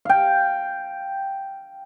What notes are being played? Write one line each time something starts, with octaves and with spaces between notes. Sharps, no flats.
F5 G5